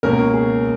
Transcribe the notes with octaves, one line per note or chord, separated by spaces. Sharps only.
C#2 B2 A#3 C#4 A#4
G#4